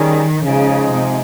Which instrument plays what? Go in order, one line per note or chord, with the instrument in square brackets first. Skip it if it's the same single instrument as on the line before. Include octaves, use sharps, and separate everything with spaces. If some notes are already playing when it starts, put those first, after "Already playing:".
Already playing: [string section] D#3 [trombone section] G3 C#4 G#4
[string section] C#3 [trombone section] F3 G#3 D#4 G#4
[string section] C3